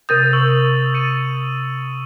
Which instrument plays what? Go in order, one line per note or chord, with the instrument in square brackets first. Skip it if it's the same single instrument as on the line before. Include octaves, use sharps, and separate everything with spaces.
[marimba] C3 A#4 G6 [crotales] D#6 A6 D#7
[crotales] C#6 E6 F#7
A6 C#7 D#7